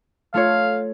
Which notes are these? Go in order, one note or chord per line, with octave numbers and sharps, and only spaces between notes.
A3 F4 C#5 F5